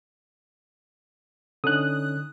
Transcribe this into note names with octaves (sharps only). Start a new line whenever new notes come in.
D3 C#4 D#4 D#6 F#6